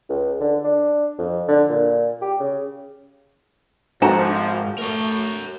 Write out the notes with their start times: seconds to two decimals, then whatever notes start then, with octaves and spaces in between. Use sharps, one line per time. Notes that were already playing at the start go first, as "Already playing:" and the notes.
0.09 C#2
0.40 D3
0.64 D4
1.19 F2
1.48 D3
1.69 A#2
2.22 G4
2.40 C#3
4.02 G#1 G#2 F3 F#4 A4 C5 A#5
4.78 A3 A#4 C#5